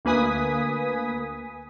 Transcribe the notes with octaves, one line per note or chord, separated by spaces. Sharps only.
D2 A#3 B4 G#5 D#6 B6